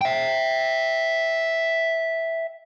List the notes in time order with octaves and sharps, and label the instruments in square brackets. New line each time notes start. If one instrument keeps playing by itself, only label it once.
[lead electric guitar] E5 G5